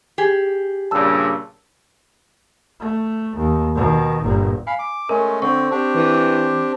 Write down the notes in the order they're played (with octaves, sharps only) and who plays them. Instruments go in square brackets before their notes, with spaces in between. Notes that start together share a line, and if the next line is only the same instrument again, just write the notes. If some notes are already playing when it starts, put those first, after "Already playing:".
[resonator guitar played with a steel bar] G4 G#4
[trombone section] G2 A#2 C#3 [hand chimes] A5 E6
[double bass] A3
D#2
B2 D#3
G1 A#2
[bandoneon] F5 B5 [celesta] G#5
[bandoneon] D6
[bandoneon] G#3 A3 C#4 [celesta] A#4
[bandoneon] D3 C4 [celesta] C#6
[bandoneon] C4 D4 G4
[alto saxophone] E3